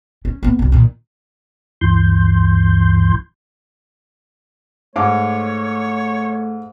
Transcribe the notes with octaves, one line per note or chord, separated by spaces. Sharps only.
C#4
A#3 B3
C2 F#3
A#2 D#3
D2 G2 E3 C6 G6
G#2 A3 C#5 F5 D6